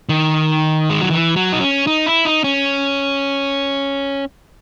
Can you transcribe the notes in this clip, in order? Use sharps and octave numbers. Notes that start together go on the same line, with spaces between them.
D#3
G#3
F#3
E3
F#3
D#4
C#4
D#4
E4
D#4
C#4